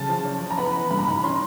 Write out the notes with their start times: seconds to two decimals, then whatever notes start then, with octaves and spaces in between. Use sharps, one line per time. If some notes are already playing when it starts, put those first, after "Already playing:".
Already playing: C#3 F#3 A5
0.09 F3
0.25 C#4
0.41 F3
0.51 A#5
0.58 B3 B5
0.75 E3
0.91 G2 B5
0.99 A#5
1.07 D#3 B5
1.23 C#4 C6